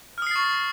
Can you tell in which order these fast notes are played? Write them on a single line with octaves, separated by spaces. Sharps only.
F6 D#6 C7 A6 C#6